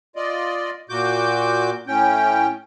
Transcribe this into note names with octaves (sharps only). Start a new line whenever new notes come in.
F4 D5 D#5
A#2 F#4 D6 G6
A2 C#4 G5